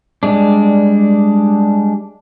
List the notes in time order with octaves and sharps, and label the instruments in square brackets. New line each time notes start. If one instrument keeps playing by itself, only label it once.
[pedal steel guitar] G3 G#3 D4